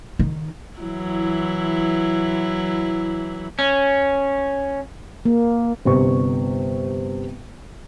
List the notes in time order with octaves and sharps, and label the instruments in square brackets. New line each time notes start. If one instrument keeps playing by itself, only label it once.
[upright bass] D#3
[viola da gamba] E3 F#3 E4
[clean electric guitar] C#4
[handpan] A#3
[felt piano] G1 C3 C#6